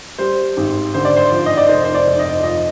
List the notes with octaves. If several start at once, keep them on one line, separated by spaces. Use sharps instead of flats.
G3 C5
G#1
D3 C5
D5
C5
F3
D#5
D5
F1 C5
C5
D5
F1
D#5
F3 D#5